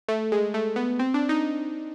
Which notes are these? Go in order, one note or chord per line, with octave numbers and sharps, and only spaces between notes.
A3
G#3
A3
B3
C4
D4
D#4